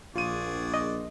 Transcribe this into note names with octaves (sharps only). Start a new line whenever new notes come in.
A#1 F4 F#4 G#4 D5 D#7
D#5